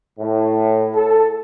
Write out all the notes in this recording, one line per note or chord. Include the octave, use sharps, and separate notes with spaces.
A2
A4